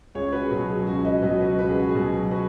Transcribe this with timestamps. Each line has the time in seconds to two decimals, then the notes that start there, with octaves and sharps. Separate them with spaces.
0.15 C#2 G#4 C#5
0.32 F#4 B4
0.45 G#4
0.51 B2 F#3 F#4
0.69 G#4
0.87 C#2 F#4
1.05 B4 D#5
1.23 B2 F#3 B4 D#5
1.41 F#4 B4
1.59 C#2 B4
1.69 G#4
1.79 F#4
1.89 G#4
1.95 B2 F#3
2.31 F#4 B4